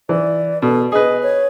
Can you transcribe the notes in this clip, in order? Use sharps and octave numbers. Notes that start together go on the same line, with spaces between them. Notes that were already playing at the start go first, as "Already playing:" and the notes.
E3 D5
B2 A4
G#4 B4 D#5
C#5